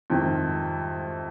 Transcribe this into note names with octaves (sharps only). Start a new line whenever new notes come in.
F2 C3 D#3